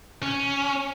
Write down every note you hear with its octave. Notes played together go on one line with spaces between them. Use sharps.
C#4